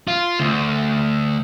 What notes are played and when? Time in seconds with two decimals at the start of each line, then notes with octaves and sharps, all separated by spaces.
0.08 F4
0.40 D2